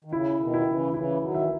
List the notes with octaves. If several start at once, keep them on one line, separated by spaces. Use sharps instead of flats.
D#3
C#3 E4
B2 D#3
E4
C#3 E3
D#3
C#3 E3 E4
D#3 F#3
E3 E5